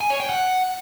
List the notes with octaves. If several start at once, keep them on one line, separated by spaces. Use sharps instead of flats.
G#5
C#5
G5
F#5